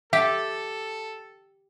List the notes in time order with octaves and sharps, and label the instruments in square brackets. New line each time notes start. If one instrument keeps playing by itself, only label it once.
[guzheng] G4 [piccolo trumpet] A4 [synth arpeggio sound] E5